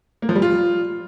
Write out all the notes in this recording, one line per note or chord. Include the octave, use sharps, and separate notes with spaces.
A#3
F3
G3
F4